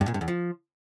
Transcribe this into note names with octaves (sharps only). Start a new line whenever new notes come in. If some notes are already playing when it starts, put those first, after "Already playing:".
G2
A#2
G2
E2
F3